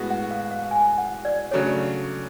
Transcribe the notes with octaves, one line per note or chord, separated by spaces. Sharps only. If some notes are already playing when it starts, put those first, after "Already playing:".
Already playing: A2 G#3 B3 F#4
F#5
F5
F5
G#5
F#5
D5
C#3 F#3 A3 D4 C#5